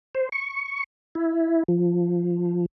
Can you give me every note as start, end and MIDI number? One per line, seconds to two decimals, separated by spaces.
0.15 0.29 72
0.32 0.83 85
1.15 1.63 64
1.68 2.66 53